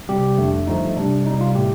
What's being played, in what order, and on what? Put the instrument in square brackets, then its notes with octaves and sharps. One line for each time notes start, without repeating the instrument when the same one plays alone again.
[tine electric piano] C3 G3 G4
F2 D3 A3
G2 F3 A3 D#4
C3 G3 D4
C3 G3 D#4
F4
A2 A3 G4